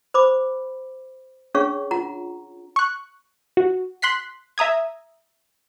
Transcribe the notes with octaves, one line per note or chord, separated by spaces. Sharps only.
C5 B5 D6
C#4 D4 G#4 C#5 F5 C#6
F4 F#5 A#5
C#6 F#6
F#4
C6 F#6 B6 C7
E5 A#5 D#6 G#6